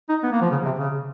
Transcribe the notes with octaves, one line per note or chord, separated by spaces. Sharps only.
D#4
B3
A#3
F3
C#3
C3
C#3